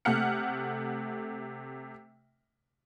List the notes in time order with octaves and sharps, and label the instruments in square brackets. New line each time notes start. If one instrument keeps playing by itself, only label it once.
[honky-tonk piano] C3 A3 F#5 F6 C#7